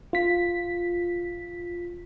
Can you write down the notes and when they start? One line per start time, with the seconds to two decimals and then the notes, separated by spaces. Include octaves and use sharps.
0.13 F4 B6